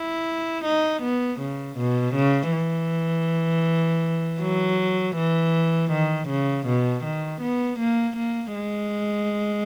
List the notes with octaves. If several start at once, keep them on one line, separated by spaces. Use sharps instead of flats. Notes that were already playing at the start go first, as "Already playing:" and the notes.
Already playing: E4
D#4
B3
C#3
B2
C#3
E3
F#3
E3
D#3
C#3
B2
D#3
B3
A#3
A#3
G#3